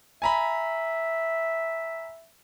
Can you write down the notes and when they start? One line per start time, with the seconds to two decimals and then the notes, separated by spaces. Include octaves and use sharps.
0.22 E5 G#5 A#5 B5